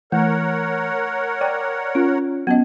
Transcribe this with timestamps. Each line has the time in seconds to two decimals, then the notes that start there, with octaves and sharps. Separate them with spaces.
0.12 E3 A3 A#4 C#5 F#5
1.41 D5 G5
1.95 C#4 F4
2.47 F#3 B3 C#4 D#5